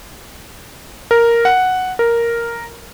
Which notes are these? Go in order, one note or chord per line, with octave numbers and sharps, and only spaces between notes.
A#4
F#5
A#4